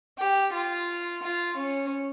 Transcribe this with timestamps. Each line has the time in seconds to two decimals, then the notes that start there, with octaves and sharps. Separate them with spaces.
0.17 G4
0.52 F4
1.22 F4
1.56 C#4